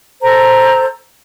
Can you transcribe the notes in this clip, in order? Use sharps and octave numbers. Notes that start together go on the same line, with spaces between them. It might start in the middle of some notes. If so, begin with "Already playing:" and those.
A4 C5 A#5